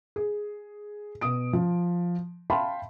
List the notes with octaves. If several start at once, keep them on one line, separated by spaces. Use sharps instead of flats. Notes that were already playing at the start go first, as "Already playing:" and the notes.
G#4
B2 D#6 D7
F3
E5 F5 G5 A5 B5 C6